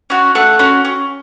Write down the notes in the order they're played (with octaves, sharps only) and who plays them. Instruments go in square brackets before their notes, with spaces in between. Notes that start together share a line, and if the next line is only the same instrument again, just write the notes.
[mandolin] C#4 F#4
A3 F#5
C#4 F#4
C#4